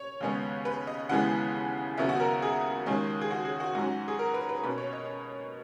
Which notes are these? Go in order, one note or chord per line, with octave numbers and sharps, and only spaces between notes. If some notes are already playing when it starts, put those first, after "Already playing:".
Already playing: C#5
D#2 C#3 G#3 B3
B4
D#5
D#2 C#3 E3 G#3 B3 F#5
D#2 C#3 F#3 B3 E5
F#4
A#4
G#4
D#2 D#3 G#3 C#4
G#4
F#4
G#4
F#4
G#2 F#3 C#4 F#4
F#4
G#4
A#4
B4
B4
B2 A#3 C#4 B4
C#5
D#5